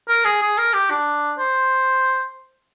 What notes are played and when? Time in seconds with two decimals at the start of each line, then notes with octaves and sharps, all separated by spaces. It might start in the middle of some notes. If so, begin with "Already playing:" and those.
0.09 A#4
0.25 G#4
0.42 G#4
0.58 A#4
0.73 G4
0.90 D4
1.38 C5